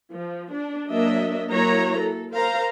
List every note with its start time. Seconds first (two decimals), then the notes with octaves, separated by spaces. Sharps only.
0.12 F3
0.52 D4
0.89 F#3 A#3 D4 D#5 E5
1.51 F#3 A#3 E4 C#5 A#5
1.99 A4
2.32 A#4 C5 F5 A#5